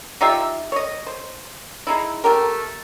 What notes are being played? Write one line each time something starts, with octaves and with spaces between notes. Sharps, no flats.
D#4 F4 G4 E5
C#5 D#5
C5
G#3 D#4 E4
A3 G4 A#4